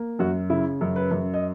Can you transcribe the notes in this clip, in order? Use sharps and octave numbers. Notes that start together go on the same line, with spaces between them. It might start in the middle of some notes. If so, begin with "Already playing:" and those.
Already playing: A#3
F#2 F#4
C#3 E4
F#2
B4
F#2
D#5